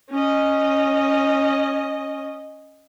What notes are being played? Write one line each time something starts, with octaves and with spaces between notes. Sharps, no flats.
C#4 D#5